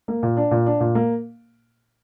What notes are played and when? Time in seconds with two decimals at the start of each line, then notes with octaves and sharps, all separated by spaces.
0.08 A#3
0.23 A#2
0.37 D4
0.51 A#2
0.67 D4
0.80 A#2
0.95 A#3